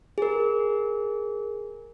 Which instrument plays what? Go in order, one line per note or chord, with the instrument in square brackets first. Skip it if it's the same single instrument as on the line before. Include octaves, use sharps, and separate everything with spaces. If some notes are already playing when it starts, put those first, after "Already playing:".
[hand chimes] G#4 A#4